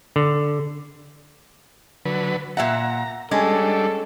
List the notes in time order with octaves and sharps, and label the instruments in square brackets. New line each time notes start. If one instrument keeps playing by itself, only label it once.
[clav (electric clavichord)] D3
[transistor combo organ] D3 F#3 B4
[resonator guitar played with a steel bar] A#2 E5 F#5 [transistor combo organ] A#5
[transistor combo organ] G3 D4 [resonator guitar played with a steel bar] G#3 C#4 [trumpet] A4